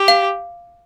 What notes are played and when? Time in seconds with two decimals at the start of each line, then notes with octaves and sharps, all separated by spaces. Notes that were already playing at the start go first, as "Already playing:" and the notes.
Already playing: G4
0.08 F5